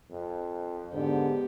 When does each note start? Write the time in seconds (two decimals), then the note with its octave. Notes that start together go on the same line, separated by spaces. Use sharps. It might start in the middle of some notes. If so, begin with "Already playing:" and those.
0.11 F2
0.93 G#2 D3 B3 G4